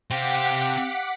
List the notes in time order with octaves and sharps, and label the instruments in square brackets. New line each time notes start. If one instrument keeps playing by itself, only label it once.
[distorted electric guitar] C3 C4 [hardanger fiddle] G4 F5 [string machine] F#5 D6 B6